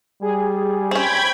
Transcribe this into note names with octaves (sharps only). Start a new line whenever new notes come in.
G3 G#4
C4 C#4 G5 B5 G#6